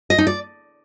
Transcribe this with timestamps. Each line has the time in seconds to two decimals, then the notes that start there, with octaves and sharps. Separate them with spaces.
0.10 D#5
0.18 D#4
0.27 D5